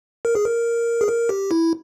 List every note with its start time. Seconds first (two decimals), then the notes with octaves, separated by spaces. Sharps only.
0.25 A#4
0.35 G#4
0.45 A#4
1.01 G#4
1.08 A#4
1.29 G4
1.51 E4